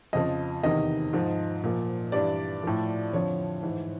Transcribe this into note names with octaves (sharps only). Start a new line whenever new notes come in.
F2 C#3 F3 D#5
E2 C3 D#3 D#5
G#2 F3
A#2 F3
G2 E3 D5
A2 F3
F2 D3 F3 C#5
G#2 E3